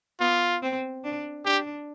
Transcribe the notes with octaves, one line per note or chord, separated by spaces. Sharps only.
B3 F4
C4
D4
D4 G4